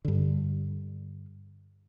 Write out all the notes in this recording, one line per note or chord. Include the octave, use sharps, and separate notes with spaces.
G2 D3